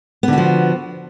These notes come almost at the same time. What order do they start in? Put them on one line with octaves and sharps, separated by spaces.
B3 D3 F#4 F3